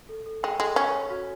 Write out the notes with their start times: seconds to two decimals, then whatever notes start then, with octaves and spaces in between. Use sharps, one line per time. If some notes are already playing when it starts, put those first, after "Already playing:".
0.09 A4
0.26 A4
0.43 G#3 G5
0.60 G#3 A4
0.76 C#4 C#5
0.94 C#5
1.10 F#4